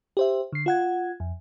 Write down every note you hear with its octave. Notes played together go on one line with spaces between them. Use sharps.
G4 C5 E5
D3 C7
F4 F#5 G#6
F2